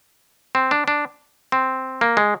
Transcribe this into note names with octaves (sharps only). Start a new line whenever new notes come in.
C4
D4
D4
C4
A#3
G#3